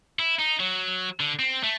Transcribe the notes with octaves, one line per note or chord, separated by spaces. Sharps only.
E4
D#4
F#3
D3
C4
A3